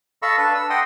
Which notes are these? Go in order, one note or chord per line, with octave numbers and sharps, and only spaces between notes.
A4 D#5 F5 B5 C#6 E6
D4 B4 A5
E6
D#5 F#5 G5 C6 D#6